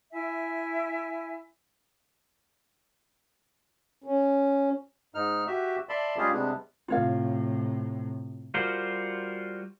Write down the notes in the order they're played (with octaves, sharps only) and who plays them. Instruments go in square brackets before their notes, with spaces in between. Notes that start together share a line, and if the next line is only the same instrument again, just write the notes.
[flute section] E4 E5 G#5
[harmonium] C#4
[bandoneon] G#2 D#4 F6
F#4 G4 E5
D5 E5 A5 B5 C6
G3 G#3 C#4 F4 G4 G#4
C3 G3 G#3 B3 D4
[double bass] A2 C3 [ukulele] F4 C#5 F5
[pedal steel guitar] G3 F4 F#4 A#4 C5